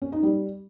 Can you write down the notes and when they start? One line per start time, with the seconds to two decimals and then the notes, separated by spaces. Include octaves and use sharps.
0.02 C#4
0.12 D#4
0.23 G3